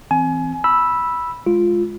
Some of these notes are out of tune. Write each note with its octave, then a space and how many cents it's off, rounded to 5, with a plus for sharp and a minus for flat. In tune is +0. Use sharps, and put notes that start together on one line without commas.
E3 +0 C4 -10 G#5 +25
B5 -10 E6 +0
G#3 +0 F4 +0